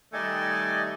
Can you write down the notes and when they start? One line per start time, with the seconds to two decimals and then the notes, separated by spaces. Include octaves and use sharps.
0.13 D#3 G3 A3 D5 D#5 G#5